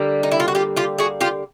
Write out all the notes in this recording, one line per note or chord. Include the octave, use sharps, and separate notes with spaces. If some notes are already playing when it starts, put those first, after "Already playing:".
Already playing: D3 G3 A#3
D#4
E4
F4
F#4
F4 G4
F4 G4
F#4 G#4
F4 G4